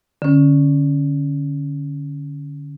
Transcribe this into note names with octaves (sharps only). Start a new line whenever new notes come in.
D3 C#4